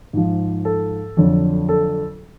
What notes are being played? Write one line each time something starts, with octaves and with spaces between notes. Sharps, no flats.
G#2 F3
A4
F2 D3 F#3
A4